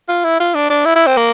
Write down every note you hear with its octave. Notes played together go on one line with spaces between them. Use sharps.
F4
E4
F4
D4
D4
E4
E4
C4
A#3